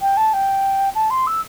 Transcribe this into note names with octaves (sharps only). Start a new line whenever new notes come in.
G5
A5
G5
A5
C6
E6